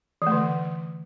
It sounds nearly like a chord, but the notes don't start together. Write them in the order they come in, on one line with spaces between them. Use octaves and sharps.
E3 A3 D3